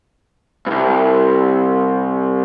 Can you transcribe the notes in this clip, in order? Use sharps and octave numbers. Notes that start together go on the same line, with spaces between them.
C2 G2